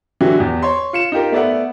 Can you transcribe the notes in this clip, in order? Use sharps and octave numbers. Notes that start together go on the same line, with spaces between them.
D3 E3 F#3 E4 F#4 G4
E2 G4
C#5 C6
F4 C#7 E7
D#4 F4 G4 A#4
A3 B3 D5 E5 F#5